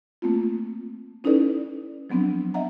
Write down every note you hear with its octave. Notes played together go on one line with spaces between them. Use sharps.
A3 A#3 C4 F4
C#4 D#4 E4 A4 B4 D5
F3 F#3 B3 C4 D4
D#5 E5 F#5 A#5